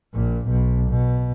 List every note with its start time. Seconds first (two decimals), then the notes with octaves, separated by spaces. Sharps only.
0.13 A#1 A#2
0.48 B1 B2
0.89 B2